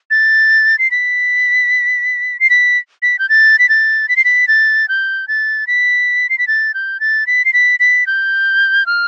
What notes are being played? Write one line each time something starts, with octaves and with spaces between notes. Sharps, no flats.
A6
C7
B6
C7
B6
B6
G6
A6
B6
A6
B6
C7
B6
A6
G6
A6
B6
C7
B6
A6
G6
A6
B6
C7
B6
B6
G6
F6